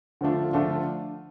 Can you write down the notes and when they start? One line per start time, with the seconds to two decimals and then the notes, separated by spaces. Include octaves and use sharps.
0.21 D3 F3 A3 D4 F4
0.53 D3 F3 A3 D4 F4